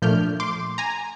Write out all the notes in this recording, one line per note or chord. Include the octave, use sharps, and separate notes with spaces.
A#2 F3 A3 D4 F6 G6
C6 D6
G#5 A#5